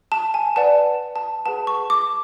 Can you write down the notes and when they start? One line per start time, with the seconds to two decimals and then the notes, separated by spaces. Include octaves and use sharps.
0.12 A5
0.34 G#5
0.56 B4 D5 F#5 A5
1.16 A5
1.46 G#4 B4 F#5 A5
1.67 C#6
1.90 D6